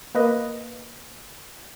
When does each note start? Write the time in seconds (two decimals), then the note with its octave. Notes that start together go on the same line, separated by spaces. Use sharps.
0.15 A#3 B4 D#5